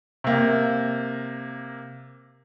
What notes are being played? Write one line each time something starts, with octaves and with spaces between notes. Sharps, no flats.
C3 A#3